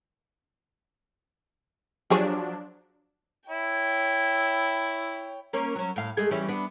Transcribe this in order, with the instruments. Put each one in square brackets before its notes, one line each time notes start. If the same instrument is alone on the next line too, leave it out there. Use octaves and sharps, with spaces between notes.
[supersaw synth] F3 F#3 D4 [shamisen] G4 G#4 C#5
[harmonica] E4 [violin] C#5 G5
[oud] A#3 C#4
F#3 C#4
A2 F5
G#3 A3 G#4
E3 G3 C#4
B3 D4